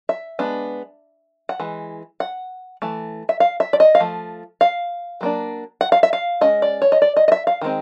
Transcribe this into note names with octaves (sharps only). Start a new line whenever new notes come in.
E5
G#3 B3 D4
F#5
E3 G#3
F#5
E3 A3
E5
F5
E5
D5
D#5
F5
F3 A3
F5
F#3 A#3 D4
F#5
F5
E5
F5
G#3 C#4 D#5
D5
C#5
D#5
D5
D#5
D#5
E5
F5
D#3 G#3 C4